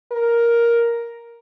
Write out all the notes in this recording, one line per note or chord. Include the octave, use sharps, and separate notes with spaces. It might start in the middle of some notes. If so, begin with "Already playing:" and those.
A#4